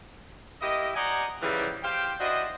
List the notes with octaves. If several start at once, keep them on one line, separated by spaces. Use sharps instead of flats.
A#3 E4 G4 D#5
C5 D5 D#5 F#5 G#5 A#5
G#2 C#3 E3 F3 G3
G4 C5 F5 G5
D4 E4 F#4 C5 D#5